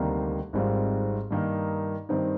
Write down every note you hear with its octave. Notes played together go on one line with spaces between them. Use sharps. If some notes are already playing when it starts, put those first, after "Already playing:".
Already playing: D2 C3 D#3 G3 A#3
G#1 G#2 G3 C4 F4
G2 D#3 A#3 D#4
G2 D#3 G3 C4 D#4